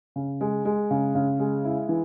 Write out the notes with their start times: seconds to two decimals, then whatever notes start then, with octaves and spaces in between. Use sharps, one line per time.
0.16 C#3
0.41 G#3
0.65 G#3
0.91 C#3
1.15 C#3
1.39 G#3
1.65 E4
1.89 E3